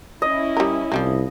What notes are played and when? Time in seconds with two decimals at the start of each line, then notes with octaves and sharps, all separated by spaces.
0.22 C#4 E4 D#5
0.57 G3 A#4
0.92 C2 F3 G3 A#3